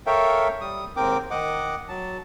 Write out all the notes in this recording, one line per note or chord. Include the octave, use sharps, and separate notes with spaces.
A4 A#4 C#5 E5 F5 G5
G3 D#6
D#2 G#2 C4 A#4 G5 D6
D#3 D#5 F#5 D6
F#3 A5